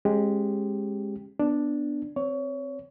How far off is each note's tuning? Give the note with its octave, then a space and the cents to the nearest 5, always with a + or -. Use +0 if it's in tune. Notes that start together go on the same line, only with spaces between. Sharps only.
G#3 +0 C#4 -35 G4 +0
B3 +0 D4 +0
C4 +0 C#5 +25